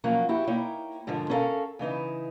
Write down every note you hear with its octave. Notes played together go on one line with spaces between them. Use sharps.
F3 F#3 A#3 C#4 F#4
E4 F#4 G4
A#3 D#4 E4 C#5 G5
G#2 D3 D#3 F3 G#3
C#4 E4 A4 A#4 F5
C#3 E3 D#4 E4